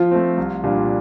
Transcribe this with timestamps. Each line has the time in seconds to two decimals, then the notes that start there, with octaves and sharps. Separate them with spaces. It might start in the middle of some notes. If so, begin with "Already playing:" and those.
Already playing: F3 F4
0.11 A3 C4
0.37 C2
0.64 A#2 G3 D4